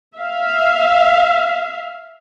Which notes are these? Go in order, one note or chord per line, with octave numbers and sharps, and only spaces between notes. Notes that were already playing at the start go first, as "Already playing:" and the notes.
E5 F5